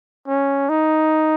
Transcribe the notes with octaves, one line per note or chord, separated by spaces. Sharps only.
C#4
D#4